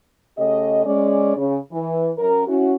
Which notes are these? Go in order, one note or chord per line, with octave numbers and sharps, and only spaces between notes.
C#3 A3 G4 D#5
G#3 C#4 D5
C#3
E3
F#2 A#4
C#4 E4 F#4